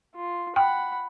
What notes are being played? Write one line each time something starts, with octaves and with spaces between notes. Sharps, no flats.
F4
F#5 G5 B5